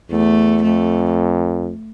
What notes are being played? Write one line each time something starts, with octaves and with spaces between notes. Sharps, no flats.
E2 A3
F2 A3